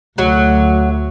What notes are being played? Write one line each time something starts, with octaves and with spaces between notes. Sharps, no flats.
D2 F#3